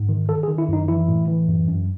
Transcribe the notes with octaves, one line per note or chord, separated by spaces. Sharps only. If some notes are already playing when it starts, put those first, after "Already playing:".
Already playing: G#2
D#3
D#3 A4
G#4
D#3
E4
F#2 D#4
E3 E4
A2
E3
F#2
F#2